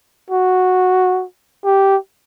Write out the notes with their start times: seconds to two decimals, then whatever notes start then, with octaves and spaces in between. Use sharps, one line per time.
0.30 F#4
1.65 G4